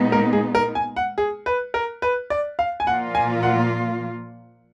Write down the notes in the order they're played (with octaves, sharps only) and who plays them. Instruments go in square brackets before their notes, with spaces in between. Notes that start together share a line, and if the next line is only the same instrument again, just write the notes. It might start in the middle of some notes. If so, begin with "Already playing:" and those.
Already playing: [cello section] A#2 G#3 B3 D#4
[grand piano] A#4
G#4
A#4
G#5
F#5
G#4
B4
A#4
B4
D5
F5
G#5
[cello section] A#2 F3 A#3 F4 [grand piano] F#5
[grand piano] G#5
F#5